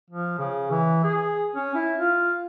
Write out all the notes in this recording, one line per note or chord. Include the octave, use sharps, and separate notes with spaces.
F3
C#3
E3
G#4
C#4
E4
F4